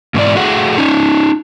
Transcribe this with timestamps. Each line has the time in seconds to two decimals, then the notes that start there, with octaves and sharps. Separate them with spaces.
0.14 G#2 B2 E3 D5
0.35 A3 F#4 G#4 F#5
0.78 C#4 D#4